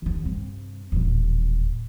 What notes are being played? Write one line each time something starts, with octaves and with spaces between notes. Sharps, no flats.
D#2 D3
G2 C3
D#1 A1